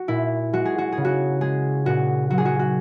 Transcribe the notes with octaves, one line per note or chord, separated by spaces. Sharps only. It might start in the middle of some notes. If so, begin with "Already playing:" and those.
Already playing: F#4
A#2 E4
G#3 F#4
G#4
F#4
C#3 G#4
F#4
G#3 G#4
A#2 F#4
F#3 F#4
G#4
F#4
F#4